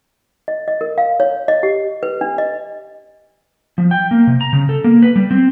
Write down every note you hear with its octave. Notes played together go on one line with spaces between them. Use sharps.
D#5
D#5
A#4
F5
C#5
D#5
G4
B4
D4
D#5
F3
G5
A#3
C3
A#5
C#3
A4
A#3
B4
G3
C4